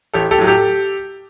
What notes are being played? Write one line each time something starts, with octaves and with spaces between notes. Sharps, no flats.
A1 G4 A4
G4 A4
A2 F#3
G4 A4